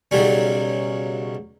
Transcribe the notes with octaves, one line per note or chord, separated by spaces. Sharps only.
B1 C#3 F#3 G3 C#4